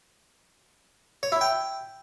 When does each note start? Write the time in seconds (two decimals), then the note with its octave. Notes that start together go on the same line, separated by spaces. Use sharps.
1.23 C#5
1.32 E4
1.41 G5